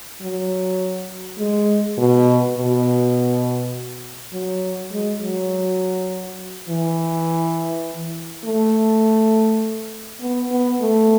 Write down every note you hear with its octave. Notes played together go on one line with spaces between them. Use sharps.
F#3
G#3
B2
B2
F#3
G#3
F#3
E3
A3
B3
B3
A3